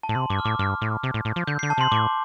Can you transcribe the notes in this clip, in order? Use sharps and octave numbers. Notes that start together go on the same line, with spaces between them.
A5
A2
C3 C6
G2 D6
F6
A2 D6
G2 F6
A2
C3
A2
A2
F3
D3 G6
C7
D3
A5
C3 C6
A2 D6